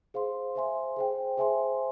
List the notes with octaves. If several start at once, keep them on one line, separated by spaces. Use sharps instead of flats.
G#4 C5 F5 C6
C5 E5 G#5 C6
G#4 C5 G5
G#4 C5 E5 G#5 C6